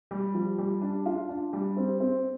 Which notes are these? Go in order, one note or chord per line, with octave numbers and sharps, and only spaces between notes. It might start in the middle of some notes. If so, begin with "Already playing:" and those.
G3
F3
G3
D4
F4
D4
G3
C4
C4